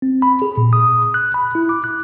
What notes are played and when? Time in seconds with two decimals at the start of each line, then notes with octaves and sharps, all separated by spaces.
0.02 C4
0.22 B5
0.42 G#4
0.57 A#2
0.73 D#6
1.14 F#6
1.34 B5
1.55 E4
1.69 D6
1.84 F#6